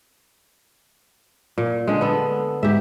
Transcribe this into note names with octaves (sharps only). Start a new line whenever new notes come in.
A#2
D3 G#3
B3 A4
G#2 G4 E5